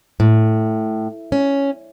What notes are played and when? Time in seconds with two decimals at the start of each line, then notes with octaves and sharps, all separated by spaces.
0.20 A2
1.32 C#4